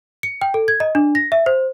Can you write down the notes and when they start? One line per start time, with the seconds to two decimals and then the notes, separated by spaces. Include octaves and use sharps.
0.23 C#7
0.42 G5
0.54 A4
0.68 G#6
0.80 D#5
0.95 D4
1.15 A#6
1.32 E5
1.46 C5